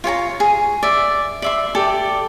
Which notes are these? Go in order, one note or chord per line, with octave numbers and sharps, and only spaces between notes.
F4 C#5 G#5 A#5
G#4
D5 E5
D5 E5 C6
G4 A4 D5